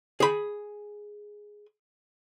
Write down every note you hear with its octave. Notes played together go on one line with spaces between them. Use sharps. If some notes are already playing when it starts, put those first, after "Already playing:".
G#4 B5